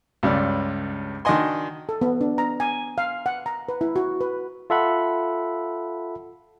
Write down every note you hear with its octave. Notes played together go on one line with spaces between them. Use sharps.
C#2 G2 C#4 D5
D#3 D4 F#4 D#5 G#5 C6
A4
B3
D4
A#5
G#5
F5
F#5
A#5
B4
E4
F#4
B4
F4 A4 E5 F#5 B5